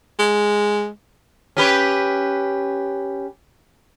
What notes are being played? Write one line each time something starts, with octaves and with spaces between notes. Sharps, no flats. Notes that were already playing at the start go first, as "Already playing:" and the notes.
G#3
C#4 G4 B4